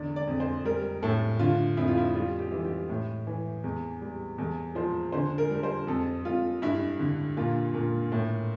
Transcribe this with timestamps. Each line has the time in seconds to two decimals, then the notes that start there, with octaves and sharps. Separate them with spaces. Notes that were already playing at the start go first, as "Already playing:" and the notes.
Already playing: E2 D3 D5
0.16 D5
0.27 F2
0.40 C5
0.65 G3 A#4
1.02 A2 A4
1.39 D3 F4
1.77 F2 E4
1.88 F4
1.97 E4
2.15 G3 F4
2.39 G4
2.51 E3
2.65 G4
2.89 A2
3.27 E3
3.64 E2
4.01 G3
4.38 E2 A4
4.75 F3 C5
5.12 D3 C5
5.38 A#4
5.51 G3
5.63 C5
5.87 F2 A4
6.25 F2 F4
6.62 G2 E4
6.99 D3
7.37 A#2 F4
7.74 A#2
8.12 A2